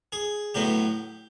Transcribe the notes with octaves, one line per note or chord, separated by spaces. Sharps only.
G#4
A2 F#3 B3 G4